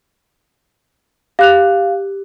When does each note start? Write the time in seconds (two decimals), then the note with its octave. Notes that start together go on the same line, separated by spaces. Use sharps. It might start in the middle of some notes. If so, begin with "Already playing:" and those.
1.39 G4 F5 F#6 F7